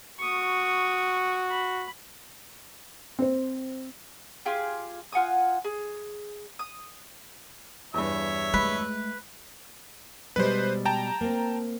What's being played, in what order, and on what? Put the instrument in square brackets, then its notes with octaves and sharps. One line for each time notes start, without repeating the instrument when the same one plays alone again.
[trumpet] F#4 [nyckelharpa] C#6 D#6
[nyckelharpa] B5
[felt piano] C4 C5
[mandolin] F4 G4 G#4
F4 F#5 G#5 D#6
G#4
D#6
[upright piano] E2 G2 [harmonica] C#5 E5
[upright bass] G#3 A3 [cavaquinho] B4
[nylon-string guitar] B2 G3 G#3 [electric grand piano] B4 C5
[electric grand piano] G5 A5 A#5
[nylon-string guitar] A#3 C4